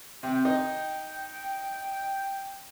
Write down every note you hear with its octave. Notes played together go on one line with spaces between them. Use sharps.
C3 G5
D#4